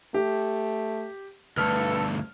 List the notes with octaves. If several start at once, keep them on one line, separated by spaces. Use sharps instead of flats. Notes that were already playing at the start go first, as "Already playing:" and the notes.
A3 G4
D2 G2 A4 B4 F6